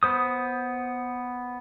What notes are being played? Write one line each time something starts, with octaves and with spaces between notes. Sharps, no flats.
B3 C5 D#6